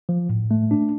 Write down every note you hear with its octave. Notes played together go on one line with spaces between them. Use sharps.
F3
A2
A3
D4